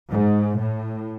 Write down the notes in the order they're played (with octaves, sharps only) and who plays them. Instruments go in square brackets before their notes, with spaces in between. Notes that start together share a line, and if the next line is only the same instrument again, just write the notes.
[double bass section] G#2
A2